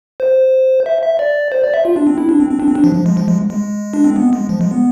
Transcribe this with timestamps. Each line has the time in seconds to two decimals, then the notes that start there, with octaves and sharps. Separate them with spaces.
0.20 C5
0.86 E5
1.03 E5
1.19 D5
1.52 C5
1.64 D5
1.74 E5
1.85 F4
1.96 D4
2.07 C4
2.18 E4
2.29 D4
2.40 C4
2.51 C4
2.60 D4
2.68 C4
2.75 D4
2.84 F3
2.95 F3
3.06 G#3
3.17 F3
3.28 G#3
3.50 G#3
3.93 D4
4.04 C4
4.16 B3
4.33 G#3
4.49 F3
4.61 G#3
4.71 B3